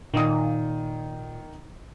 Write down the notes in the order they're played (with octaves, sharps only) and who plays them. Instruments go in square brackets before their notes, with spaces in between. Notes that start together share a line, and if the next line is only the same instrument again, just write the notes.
[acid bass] A#2 [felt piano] D#3 D#6